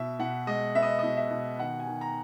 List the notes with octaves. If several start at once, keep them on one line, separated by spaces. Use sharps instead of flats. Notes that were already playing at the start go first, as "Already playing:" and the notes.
Already playing: B2 E5
B2 F#5
G#3 D#5
B3 E5
D#5
B2 D#5
E5
B2
D#3 F#5
G#5
D#3
A#5